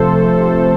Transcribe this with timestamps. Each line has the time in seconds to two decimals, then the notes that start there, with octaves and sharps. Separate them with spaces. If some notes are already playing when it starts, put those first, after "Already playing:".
Already playing: C3 F3 A3 A4 C5
0.10 C3
0.39 C3